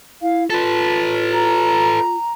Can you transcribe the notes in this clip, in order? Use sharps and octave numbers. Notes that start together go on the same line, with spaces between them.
E4 F5
F4 A4 B4 A5
A#5